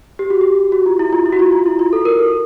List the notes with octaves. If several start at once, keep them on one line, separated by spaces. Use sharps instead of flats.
G4
F#4
G4
F#4
F4
E4
F4
E4
F#4
F4
F4
E4
F4
A4
A#4
A4